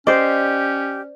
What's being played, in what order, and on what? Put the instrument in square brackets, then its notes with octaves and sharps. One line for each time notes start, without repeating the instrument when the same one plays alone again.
[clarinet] C#4 [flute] G4 [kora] C5 D5 [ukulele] D#5